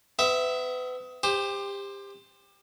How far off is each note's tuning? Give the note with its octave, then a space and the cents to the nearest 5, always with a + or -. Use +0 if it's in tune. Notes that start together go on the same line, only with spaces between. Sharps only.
B3 +35 E5 +0
G4 +25 C5 +0